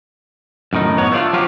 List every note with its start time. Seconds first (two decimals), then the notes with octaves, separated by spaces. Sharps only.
0.73 F#2 A2 D#3 D#4
0.98 B3 C#5
1.11 F#3 A3 D4 F4
1.33 F3 F#3 F4 G4